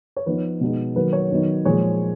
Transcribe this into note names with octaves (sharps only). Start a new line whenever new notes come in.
C#5
F3 B3 D#4 B4
B2 G#3 D#4
D#3 F#3 A#3 B4
C#5
D#3 F#3 B3 D#4
A#2 F3 G#3 C#5